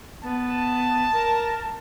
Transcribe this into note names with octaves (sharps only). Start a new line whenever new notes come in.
B3 A5
A#4